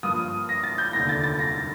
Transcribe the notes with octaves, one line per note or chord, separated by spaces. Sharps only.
G2 F3 A#3 D#6
A#6
A6
G6
F1 D#2 D3 A#6
A6
A6
A#6